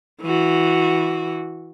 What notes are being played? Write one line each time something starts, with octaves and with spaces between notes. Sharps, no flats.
E3 F#4